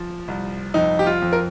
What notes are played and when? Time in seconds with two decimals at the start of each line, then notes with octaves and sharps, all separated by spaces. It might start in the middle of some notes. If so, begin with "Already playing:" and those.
Already playing: F3
0.28 C2
0.74 F2 D#4
0.99 G4
1.06 F4
1.22 F2
1.33 A#4